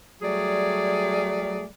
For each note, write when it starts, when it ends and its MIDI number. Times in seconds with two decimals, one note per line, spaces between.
0.22 1.64 54
0.22 1.64 55
0.22 1.64 57
0.22 1.64 68
0.22 1.64 74